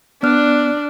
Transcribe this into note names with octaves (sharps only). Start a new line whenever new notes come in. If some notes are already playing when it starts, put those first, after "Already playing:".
B3 D4 D5 F6 F#6